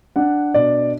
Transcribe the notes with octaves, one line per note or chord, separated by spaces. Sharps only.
D4 F#5
B2 D5